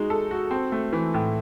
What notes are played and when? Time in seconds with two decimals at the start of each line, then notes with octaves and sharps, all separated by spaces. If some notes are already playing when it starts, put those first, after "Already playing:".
Already playing: G#3 D#4 F#4
0.10 A4
0.31 F#4
0.51 C4
0.72 A3
0.93 E3
1.14 A2